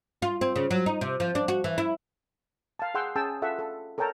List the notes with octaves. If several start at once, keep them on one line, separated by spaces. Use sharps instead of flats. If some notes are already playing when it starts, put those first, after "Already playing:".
F4
C4
C#3
F#3
D#4
C3
F3
D4
F#4
E3
E4
F5 A5
G#4 F#5 G5 C6 E6
C#4 G#4 G5 A5 E6
F4 A4 E5 F#5
A4
A4 A#4 C#5 G5 A5 A#5